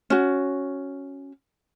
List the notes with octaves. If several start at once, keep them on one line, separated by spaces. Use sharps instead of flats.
C#4 F#4